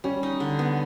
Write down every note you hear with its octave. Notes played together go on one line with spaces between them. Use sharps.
G3 C#4
D#4
D3
B3